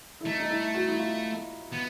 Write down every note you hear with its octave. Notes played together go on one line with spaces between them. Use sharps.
E4
A3 D#4
D#4
E4
F#4
E4
F4
B3